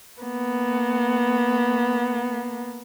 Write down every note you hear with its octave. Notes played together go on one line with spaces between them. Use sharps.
A#3 B3